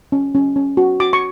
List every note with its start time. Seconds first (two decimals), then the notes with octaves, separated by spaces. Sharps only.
0.12 C#4
0.35 C#4
0.56 C#4
0.77 F#4
1.00 F#4 D6
1.13 C#6